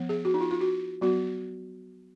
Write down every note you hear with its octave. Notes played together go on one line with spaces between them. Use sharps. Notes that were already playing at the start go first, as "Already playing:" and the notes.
Already playing: F3 B3
G#4
F#4
D#4
F4
F4
F#4
F#3 B3 F#4